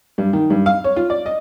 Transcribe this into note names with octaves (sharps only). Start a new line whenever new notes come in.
G2
D#3
G2
F5
C#5
F4
D5
D#5